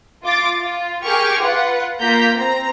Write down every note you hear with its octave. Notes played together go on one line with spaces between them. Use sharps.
F4 D6 A6
F4
G4 G#4 A#4 C#6 D6 F6
F4 B4 F#5
A#3 F4 A#5 G6 B6
C4 A#5